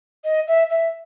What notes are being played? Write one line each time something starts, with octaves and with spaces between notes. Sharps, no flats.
D#5
E5
E5